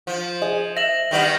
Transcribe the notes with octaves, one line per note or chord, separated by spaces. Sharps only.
F3
G#4 D#5
E5 A#6 F#7
D#3 G3 B3